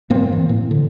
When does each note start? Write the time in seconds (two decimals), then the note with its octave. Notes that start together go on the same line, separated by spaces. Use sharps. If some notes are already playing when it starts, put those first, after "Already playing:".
0.10 G2 A#3 C4
0.32 E3
0.49 A2
0.71 D3